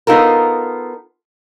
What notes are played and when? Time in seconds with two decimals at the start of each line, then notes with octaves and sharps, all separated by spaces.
0.07 B3 D#4 F4 A4 A#4